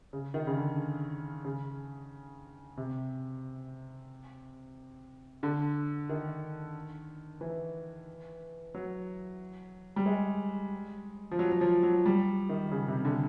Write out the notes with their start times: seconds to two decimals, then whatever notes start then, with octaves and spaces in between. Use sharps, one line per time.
0.13 C#3
0.34 D#3
0.47 C#3
0.57 D3
1.45 C#3
2.77 C3
5.43 D3
6.09 D#3
7.41 E3
8.74 F#3
9.96 G3
10.06 G#3
11.31 F3
11.39 F#3
11.52 F#3
11.61 F3
11.83 F#3
12.06 G3
12.49 D#3
12.71 C#3
12.88 C3
13.05 D3